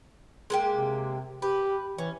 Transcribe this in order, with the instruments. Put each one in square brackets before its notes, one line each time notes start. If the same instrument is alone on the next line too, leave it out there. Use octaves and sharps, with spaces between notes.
[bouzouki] G#3 A#3 G4
[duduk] C3
[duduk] G4 [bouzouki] B4
[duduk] E3 [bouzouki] C#4